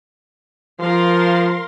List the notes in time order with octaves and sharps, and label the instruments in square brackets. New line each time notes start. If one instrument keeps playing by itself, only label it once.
[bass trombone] F3 [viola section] A#4 F5 C6